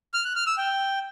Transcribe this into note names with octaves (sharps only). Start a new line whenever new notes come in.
F6
F#6
F6
E6
G5